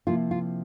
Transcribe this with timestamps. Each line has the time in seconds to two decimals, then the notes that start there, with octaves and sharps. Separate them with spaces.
0.07 C3 F3 A#3 E4 F4
0.31 F4